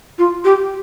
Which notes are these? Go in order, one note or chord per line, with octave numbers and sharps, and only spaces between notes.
F4
G4